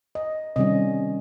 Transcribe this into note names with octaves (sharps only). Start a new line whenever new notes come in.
D#5
C3 D#3 G3 C#4 D#5